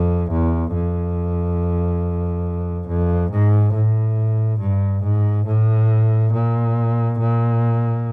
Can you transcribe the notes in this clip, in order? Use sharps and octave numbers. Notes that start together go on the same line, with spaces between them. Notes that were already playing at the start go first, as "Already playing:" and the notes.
Already playing: F2
E2
F2
F2
G#2
A2
G2
G#2
A2
A#2
A#2